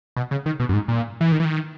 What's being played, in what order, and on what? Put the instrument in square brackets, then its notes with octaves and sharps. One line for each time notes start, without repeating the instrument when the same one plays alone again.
[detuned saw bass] B2
C#3
D#3
B2
F#2
G#2
A#2
E3
D#3
E3
D#3